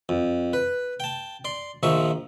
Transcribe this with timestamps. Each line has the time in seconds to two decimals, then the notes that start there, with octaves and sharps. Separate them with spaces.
0.09 F2
0.53 B4
1.00 G5 A5
1.45 D5 C6
1.83 A#1 D#3 F3 E5 C#6